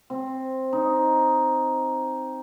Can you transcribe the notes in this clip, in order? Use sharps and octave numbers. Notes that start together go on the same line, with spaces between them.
C4
D#4